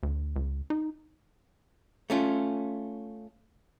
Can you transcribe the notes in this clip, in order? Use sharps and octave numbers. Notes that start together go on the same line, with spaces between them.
D2
C#2
D#4
A3 C#4 F4